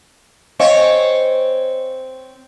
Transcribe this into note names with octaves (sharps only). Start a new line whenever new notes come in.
C4 C#5 D#5 F5 G#5